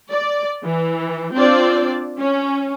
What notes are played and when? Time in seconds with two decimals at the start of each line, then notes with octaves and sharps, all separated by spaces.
0.12 D5
0.65 E3
1.34 C4 D4 F4 D5
2.19 C#4